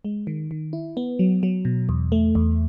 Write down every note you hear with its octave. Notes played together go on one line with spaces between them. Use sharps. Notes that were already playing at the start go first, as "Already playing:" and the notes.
G#3
D#3
D#3
E4
B3
F#3
F#3
B2
E2
A3
E2